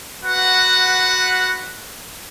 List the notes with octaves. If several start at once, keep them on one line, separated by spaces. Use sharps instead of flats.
F#4 B4 F#5